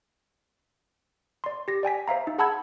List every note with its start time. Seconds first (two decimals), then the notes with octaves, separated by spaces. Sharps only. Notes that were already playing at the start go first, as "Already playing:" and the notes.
1.44 D5 C6
1.68 G4 A#6
1.83 D5 G5 G#5 B6
2.08 C5 E5 F5 A#5
2.27 D#4
2.38 G#4 F#5 A5 B5 E6 G#6